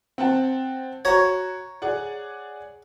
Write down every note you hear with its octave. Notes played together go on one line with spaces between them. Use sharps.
C4 F#5 A5
F#4 C#5 A#5
G#4 D5 F#5